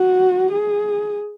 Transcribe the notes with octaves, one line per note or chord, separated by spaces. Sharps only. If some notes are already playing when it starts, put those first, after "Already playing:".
Already playing: F#4
G#4